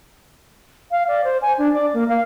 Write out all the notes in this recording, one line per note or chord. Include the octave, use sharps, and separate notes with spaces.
F5
D5
C5
G#5
D4
D5
A#3
F5